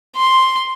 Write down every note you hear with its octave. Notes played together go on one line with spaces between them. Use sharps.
C6